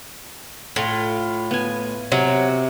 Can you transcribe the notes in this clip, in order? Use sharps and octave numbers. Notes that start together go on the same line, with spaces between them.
A2 F4
B3 G#5
C3 F#3 A#5